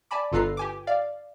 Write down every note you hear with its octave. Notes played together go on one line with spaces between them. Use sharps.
D5 G#5 A5 B5 D6
G1 F4 A4 B4 A#5 C7
G4 G#5 D6
D5 F5